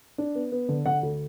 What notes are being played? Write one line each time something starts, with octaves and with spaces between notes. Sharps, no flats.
D4
B3
B3
D3
D3 F#5
D2